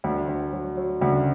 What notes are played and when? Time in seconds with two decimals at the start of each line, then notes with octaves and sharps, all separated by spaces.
0.04 D2
0.28 D2
0.52 F#3
0.77 F#3
1.01 D2 C#3